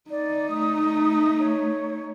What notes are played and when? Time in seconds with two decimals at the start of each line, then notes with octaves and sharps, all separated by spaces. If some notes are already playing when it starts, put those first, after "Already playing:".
0.10 D#4 D5
0.50 A3 D#6
1.39 C#5